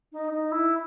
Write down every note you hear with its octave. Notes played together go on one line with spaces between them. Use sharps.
D#4
D#4
E4